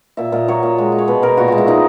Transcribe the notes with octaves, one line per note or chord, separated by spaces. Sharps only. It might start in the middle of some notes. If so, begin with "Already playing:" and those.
A#2 E5
A#2 D#5
F#3 C#5
A#2
G#3
G#3
C#5
B2 B4
B2 A#4
A#2 F#4
G#3 F#4
E4
A#2 D#4